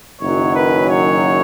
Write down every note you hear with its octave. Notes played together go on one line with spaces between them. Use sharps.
F#1 F#2 D#3 F#3 C#5
B4
C#5